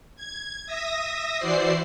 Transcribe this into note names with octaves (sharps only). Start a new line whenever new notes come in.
G#6
E5 D#6 A#6
E3 E4 F#4 C5 D5 C7